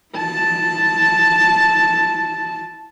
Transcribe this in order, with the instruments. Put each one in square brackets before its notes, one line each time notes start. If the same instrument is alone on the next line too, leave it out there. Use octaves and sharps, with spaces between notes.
[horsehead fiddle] E4 A5